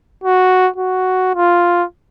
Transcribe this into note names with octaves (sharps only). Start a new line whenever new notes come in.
F#4
F#4
F4